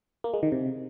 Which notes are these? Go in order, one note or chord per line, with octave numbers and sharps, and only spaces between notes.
A#3
G#3
D#3
C3